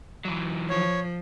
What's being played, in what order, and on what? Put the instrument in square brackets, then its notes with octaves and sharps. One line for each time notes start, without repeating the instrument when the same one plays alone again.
[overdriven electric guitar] E3 F#3
[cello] F3 [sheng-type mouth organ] C#5